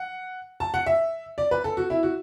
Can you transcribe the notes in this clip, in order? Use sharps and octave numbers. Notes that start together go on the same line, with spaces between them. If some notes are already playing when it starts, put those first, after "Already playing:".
Already playing: F#5
A5
F#5
E5
D5
B4
A4
F#4
E4
F#4